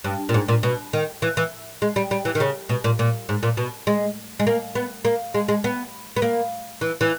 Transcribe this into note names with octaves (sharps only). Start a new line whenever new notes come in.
G2
A#2
G#2
A#2
B2
D#3
E3
E3
G#3
G3
G3
E3
D#3
C#3
B2
A#2
A#2
G#2
A#2
B2
G#3
G#3
A#3
B3
A#3
G#3
G#3
B3
B3
A#3
E3
E3